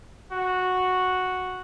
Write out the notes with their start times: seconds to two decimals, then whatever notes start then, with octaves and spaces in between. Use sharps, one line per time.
0.31 F#4